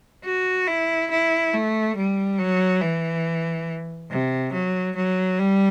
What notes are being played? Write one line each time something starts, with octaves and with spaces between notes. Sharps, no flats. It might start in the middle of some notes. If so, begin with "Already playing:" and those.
F#4
E4
E4
A3
G3
F#3
E3
C3
F#3
F#3
G3